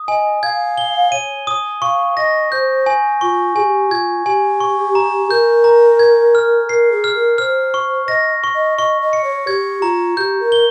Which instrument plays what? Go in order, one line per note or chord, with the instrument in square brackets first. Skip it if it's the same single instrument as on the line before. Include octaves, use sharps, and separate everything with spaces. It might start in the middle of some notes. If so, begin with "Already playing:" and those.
Already playing: [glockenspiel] D#6
[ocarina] D#5 [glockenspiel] G#5
[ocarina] F5 [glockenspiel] G#6
[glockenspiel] G7
[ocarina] C#5 [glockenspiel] D#7
[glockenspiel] D#6
[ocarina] F5 [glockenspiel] C#6
[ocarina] D#5 [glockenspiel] A#6
[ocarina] C5 [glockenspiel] G6
[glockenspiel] G#5
[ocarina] F4 [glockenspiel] C#6
[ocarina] G#4 [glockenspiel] G#5
[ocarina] G4
[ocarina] F4 [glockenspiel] G#6
[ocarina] G4 [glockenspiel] G#5
[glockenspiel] C#6
A#5
[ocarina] A#4 [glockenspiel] G6
[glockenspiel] A#5
G#6
F6
[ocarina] A#4 [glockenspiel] C7
[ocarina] G#4
[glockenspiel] F6
[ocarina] A#4
[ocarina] C5 [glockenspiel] F6
[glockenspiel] C#6
[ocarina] D#5 [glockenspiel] A#6
[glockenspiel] C#6
[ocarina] D#5
[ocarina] D#5 [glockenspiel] C#6
[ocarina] D#5
[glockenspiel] C#7
[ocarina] C#5
[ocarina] G4 [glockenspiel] G#6
[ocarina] F4 [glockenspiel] A#5
[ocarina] G4 [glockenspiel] G6
[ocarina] A#4
[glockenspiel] G7